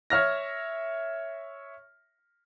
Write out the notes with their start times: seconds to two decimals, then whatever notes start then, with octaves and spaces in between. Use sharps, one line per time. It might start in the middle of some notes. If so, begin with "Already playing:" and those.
0.10 C#5 E5 F6 A#6